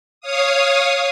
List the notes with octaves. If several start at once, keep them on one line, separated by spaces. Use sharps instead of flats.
C#5 F5 D#6